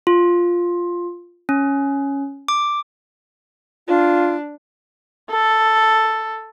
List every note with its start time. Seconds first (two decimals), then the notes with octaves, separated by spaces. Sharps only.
0.07 F4
1.49 C#4
2.48 D6
3.88 D4 F4
5.31 A4